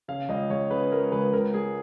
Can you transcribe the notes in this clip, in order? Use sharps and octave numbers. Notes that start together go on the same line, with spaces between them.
C#3 F5
C#2 D#5
C#2 C#5
C#3 B4
G#3 A#4
C#2 B4
C#2 A#4
G#3 G#4